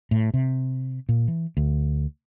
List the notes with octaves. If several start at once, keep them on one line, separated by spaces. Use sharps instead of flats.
A2
C3
A#2
E3
D2